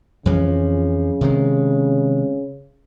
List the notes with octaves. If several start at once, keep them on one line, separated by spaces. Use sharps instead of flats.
F2 C#3 E3 F3
C3 D#3 G#3